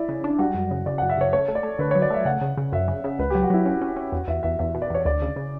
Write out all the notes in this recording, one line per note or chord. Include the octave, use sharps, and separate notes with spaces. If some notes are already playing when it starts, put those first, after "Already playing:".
Already playing: E4 D5 E5
C#3
D4
G3 F#4
F#2
C#3
C#3 D5
F#2 F#5
E5
C#3 C#5
A3 C#5
A3
D5
A3
D3 B4
F#3 C#5
D5
A3 E5
C#3 F#5
C#3
C#3
F#2 E5
C#3
C#3
C#2 B4
F#3 G4
F#4
F#3 E4
C#4 F#4
C#4
C#4
E2 F#4
E2 E5
E2 E5
E2 E5
B2
D5
E2 C#5
D2 D5
C#3
C#3